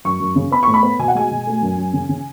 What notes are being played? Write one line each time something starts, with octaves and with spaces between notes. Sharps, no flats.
F#2 C#6
F#2
C#3
B3 B5
A2 C#6
B5
B3
B2 G#5
F#5
G#3 G#5
B2
A3
F#2
F#2
C#3
C#3